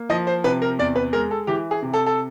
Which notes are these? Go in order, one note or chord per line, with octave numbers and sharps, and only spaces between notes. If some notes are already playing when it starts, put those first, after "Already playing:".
Already playing: A#3
F3 D#5
C5
C3 B4
A#4
E2 D5
B4
G#3 A#4
A4
E3 G4
G#4
C3
A4
A4